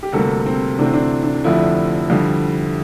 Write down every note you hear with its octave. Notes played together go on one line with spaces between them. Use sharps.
G4
D2 C3 G3 A#3 A4
C4
D2 C3 E3 A3 D4
C4
D4
D4
F1 F2 D3 F3 A3 E4
F2 D3 G3